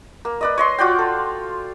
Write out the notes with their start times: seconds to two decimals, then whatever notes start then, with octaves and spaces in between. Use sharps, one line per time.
0.25 A#3
0.41 B4 D5 D#5
0.58 C#5 D#5 C6
0.78 F4 F#4 D5 G5
0.99 A4